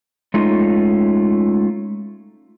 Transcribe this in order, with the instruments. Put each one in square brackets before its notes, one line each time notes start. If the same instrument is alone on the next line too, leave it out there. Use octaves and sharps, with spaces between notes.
[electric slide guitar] G#3 A3 C#4 D#4 F4